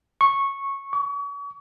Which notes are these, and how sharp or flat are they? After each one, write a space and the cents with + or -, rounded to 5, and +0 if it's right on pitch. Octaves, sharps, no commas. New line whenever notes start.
C#6 -10
C#6 +40